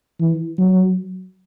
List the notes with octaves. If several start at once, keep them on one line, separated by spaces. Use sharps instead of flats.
E3
F#3